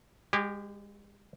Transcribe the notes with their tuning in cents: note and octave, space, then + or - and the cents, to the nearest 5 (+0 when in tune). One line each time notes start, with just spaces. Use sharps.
G#3 -35 G4 +0 G#5 -30